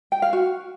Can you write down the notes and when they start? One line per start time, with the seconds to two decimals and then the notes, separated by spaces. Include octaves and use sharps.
0.12 G5
0.22 F5
0.33 F#4